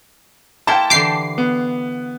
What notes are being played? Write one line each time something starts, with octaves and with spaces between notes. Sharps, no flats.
A#3 E4 C5 G5 A5
D3 E3 G4 D6 C7
B3